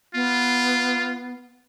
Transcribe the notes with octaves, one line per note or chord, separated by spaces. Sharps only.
B3 F4